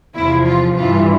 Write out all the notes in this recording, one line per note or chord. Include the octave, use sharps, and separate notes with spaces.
E2 C3 F3 E4
F4
G2 E3 F4